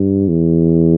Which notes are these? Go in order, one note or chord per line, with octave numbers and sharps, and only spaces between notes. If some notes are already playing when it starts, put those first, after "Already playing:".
Already playing: G2
E2